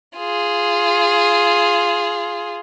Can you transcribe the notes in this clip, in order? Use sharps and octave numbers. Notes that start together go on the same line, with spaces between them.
F4 G#4